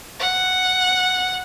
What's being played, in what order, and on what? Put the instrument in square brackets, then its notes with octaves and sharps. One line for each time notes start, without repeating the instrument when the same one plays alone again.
[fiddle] F#5